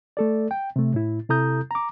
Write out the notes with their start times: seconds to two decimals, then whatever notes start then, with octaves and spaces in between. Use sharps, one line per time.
0.17 A3 A4 D5
0.51 G5
0.76 C3 A3
0.94 A2 E4
1.29 C3 E4 A4 A#5 D#6 G6
1.71 A#5 D6